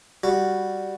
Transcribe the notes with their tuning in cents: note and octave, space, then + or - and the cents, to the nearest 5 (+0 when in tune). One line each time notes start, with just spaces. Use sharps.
G3 +0 F#4 +0